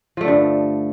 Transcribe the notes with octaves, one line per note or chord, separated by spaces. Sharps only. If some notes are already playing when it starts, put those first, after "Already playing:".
G2 D3 F3 A3